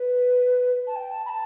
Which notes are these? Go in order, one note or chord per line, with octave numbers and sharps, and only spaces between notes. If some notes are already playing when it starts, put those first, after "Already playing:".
Already playing: B4
A5
G5
A5
B5
A5